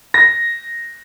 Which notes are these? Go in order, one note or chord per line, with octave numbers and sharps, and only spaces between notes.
A#6